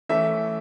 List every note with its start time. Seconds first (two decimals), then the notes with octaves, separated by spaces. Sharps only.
0.09 E3 A3 C#4 E5